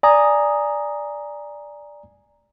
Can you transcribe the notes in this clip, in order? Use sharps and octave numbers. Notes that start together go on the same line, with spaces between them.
D5 G#5 A#5 D#6